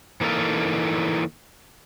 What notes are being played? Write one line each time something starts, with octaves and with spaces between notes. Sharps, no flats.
E3 A#3 D#4 A4 F5